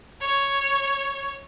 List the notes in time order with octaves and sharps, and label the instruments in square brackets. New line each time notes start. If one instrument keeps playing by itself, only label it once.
[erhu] C#5